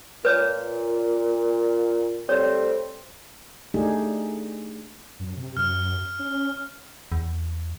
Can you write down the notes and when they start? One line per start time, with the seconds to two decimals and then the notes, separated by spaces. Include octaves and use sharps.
0.25 A#2 B4 C#5
2.29 G3 A3 C4 C#5
3.74 A3 D4 D#4 G4 G#4
5.19 F#2
5.37 C3
5.57 F#2 F6
6.19 C#4
7.12 E2